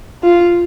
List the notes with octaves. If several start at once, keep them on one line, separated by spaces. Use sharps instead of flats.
F4